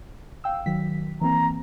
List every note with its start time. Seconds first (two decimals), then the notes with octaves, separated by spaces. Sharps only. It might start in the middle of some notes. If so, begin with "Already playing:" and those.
0.44 F5 G5 E6
0.66 D#3 F#3 B6
1.21 E3 A#3 C4 A#5